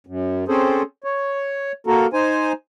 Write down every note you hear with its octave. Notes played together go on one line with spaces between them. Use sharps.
F#2
C4 C#4 G#4 A4 C5
C#5
A#3 F#4 A4 A#4
D#4 C5 G#5